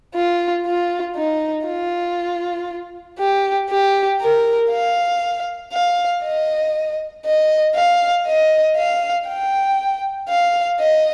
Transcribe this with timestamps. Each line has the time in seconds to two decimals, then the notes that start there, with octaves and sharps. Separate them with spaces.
0.15 F4
0.66 F4
1.16 D#4
1.67 F4
3.19 G4
3.70 G4
4.21 A#4
4.72 F5
5.73 F5
6.24 D#5
7.25 D#5
7.75 F5
8.26 D#5
8.76 F5
9.28 G5
10.29 F5
10.79 D#5